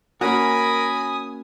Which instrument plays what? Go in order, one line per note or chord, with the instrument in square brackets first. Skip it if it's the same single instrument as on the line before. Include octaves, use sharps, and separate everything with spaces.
[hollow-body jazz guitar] A#3 C#4 F#4 [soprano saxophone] A#4 [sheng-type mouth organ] G#5 D#6 [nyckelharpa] B5